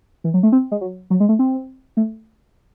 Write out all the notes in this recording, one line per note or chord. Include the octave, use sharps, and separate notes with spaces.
E3
F#3
A3
C4
G#3
F#3
F#3
G#3
A3
C4
A3